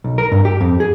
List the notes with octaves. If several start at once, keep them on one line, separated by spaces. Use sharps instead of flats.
B1
A#4
G2
G4
F2
G#4